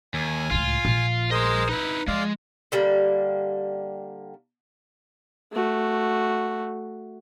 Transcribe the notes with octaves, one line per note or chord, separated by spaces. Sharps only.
D#2 G#5
C#2 A2 F4
A#1
G#4 A#4 C5 D#5 C6
D#4 E4 B4
F3 G#3 D5 F5
D3 G3 A#3
A3 F#4